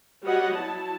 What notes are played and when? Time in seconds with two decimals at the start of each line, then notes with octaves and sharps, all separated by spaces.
0.23 G3 F#4 B4 C#5 D#5 F#5
0.54 F#3 E4 A5